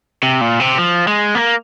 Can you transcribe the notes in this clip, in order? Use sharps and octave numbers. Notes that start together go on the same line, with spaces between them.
C3
A#2
C3
F3
G#3
A#3